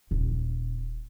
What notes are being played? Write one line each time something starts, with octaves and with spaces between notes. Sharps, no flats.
D#1